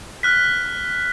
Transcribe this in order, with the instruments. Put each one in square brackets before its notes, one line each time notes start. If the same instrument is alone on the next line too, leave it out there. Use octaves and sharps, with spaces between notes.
[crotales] F6 F#6 B6